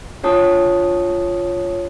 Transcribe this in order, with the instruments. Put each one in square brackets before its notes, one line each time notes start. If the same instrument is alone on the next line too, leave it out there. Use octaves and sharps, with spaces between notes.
[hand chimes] D4 F4 C#5 A5 D#6